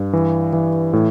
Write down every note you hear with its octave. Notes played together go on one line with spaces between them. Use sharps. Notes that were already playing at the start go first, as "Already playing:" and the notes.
Already playing: G2
E3
E3
A2